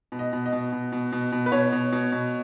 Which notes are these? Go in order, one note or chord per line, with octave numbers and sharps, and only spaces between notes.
B2
D#5
B2
D#5
B2
B2
B2
B2
B2
B4
B2 C#5
B2
B2
B2